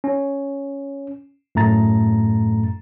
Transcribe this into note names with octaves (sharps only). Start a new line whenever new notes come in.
C#4
F#2 A2 A3 A#5 A6